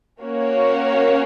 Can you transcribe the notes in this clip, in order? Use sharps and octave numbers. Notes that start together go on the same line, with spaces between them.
A#3 C#4 F#4 C#5